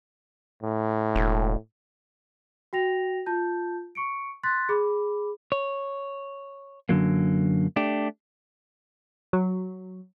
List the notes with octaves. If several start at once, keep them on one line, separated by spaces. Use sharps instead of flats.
A2
E1
F#4 G5 A#6 F7
F4 A5 G6
C#6 C#7 D7
C6 F#6 A6 B6
G#4 B5 D6
C#5
F#2 D3 F#3 A#3
A3 D4 G4
F#3